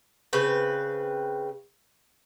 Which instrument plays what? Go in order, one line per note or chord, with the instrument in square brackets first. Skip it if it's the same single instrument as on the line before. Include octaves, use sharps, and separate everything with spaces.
[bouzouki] C#3 C4 B4